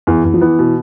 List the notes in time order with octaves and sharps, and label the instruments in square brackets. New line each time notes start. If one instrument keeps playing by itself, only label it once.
[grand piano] E2 [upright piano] E3
[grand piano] E2
[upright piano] F3
[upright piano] E3 [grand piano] B3
[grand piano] B2